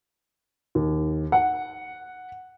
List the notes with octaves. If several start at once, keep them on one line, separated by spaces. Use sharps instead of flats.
D#2
F#5